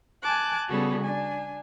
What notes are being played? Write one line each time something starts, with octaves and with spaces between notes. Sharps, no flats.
G#5 A5 D6 F#6
C#3 G3 B3 F#4 G#4 A4
D4 G#5